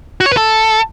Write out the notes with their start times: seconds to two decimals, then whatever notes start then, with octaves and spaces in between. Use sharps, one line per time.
0.20 F#4
0.26 C#5
0.32 B4
0.37 A4